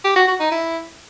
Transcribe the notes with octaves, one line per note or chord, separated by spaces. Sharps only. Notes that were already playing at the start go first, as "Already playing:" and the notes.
G4
F#4
F#4
D#4
E4